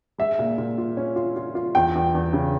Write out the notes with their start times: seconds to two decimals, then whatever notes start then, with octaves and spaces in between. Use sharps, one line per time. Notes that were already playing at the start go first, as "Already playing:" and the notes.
0.18 G#3 E5
0.39 A#2
0.58 A#2
0.78 F4
0.97 C#4
1.16 F4
1.36 F4
1.55 F4
1.75 E2 G5
1.95 E2
2.15 E2
2.33 C#3